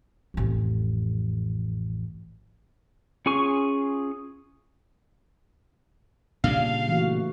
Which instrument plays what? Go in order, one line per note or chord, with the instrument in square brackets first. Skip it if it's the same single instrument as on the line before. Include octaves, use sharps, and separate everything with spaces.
[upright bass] A1 F2
[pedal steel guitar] C#4 F4 G#4 G#5 C#6
[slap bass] A#2 C#3 G3 [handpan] D4 [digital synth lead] F5
[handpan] E3 A3 F#4